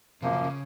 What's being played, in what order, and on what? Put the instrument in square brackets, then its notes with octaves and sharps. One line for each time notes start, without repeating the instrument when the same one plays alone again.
[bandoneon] F#2 F3 A#3 [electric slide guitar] C3
[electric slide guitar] C#3
C#3